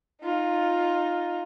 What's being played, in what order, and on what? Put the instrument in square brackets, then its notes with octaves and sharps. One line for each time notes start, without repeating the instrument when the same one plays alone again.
[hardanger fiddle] D#4 F4